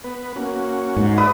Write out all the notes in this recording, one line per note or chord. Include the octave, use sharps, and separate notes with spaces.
B3 B4
A#3 C#4 F#4
G#2
B4 D5 E5 D#6